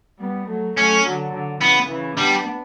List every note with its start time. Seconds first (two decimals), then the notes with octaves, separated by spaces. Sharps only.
0.20 G3 B3
0.48 F#3 A3
0.76 F#3 A3 C#4
1.05 D3 F#3
1.33 D3
1.61 C#3 E3 B3
1.89 C#3 E3
2.17 G3 B3 D4